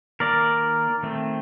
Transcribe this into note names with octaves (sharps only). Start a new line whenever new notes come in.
D#3 A#3 A#4 D5
D#3 A3 C4